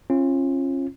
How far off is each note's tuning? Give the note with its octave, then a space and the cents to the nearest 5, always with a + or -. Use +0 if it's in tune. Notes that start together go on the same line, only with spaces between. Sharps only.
C#4 -35 F4 -20